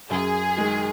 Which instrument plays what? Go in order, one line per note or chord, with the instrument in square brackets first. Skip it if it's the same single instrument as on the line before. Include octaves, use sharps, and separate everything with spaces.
[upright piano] F#2 [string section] G#4
[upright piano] D#3 G#3